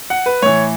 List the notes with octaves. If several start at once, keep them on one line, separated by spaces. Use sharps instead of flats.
F#5
B4
A2 E3 C#5